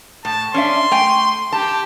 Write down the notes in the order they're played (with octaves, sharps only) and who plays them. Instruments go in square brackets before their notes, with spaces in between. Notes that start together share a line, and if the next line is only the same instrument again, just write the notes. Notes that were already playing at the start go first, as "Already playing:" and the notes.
[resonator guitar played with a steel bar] A2 [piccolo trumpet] A5
[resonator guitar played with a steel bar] C#4 D4 E5 [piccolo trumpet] C6
[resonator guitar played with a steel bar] A3 G5 G#5
[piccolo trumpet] G4 [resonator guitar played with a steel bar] A5